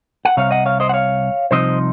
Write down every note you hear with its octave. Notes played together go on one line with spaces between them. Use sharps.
F#5
C2 C3 C#5 F5
D#5 F#5
C#5 F5
C5 D#5
F#5
C#5 F5
C2 C3 F3 C4 D#4 C5 D#5